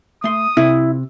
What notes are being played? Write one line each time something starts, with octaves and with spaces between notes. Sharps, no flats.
A3 C6 D#6
C3 E4